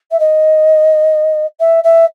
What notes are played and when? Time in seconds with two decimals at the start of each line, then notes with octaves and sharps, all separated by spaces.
0.11 E5
0.19 D#5
1.60 E5
1.83 E5